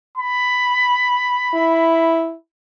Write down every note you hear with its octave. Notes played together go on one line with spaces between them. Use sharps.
B5
E4